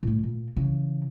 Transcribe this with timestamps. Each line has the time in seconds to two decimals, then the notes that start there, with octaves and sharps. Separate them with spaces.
0.03 A2 A3
0.23 A#2
0.56 C#3 E3